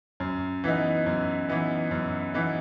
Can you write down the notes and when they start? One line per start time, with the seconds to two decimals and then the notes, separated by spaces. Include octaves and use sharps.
0.20 F#2
0.64 E3 B3 D#4
1.06 F#2
1.49 E3 B3 D#4
1.91 F#2
2.34 E3 B3 D#4